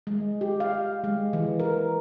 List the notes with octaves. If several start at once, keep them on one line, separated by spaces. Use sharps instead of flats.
G#3
G4
F5
G#3
E3
A#4